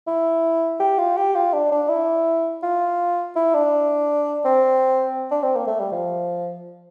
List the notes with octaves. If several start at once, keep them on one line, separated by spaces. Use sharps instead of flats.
E4
G4
F4
G4
F4
D4
D4
E4
F4
E4
D4
C4
D4
C4
A#3
A3
G3
F3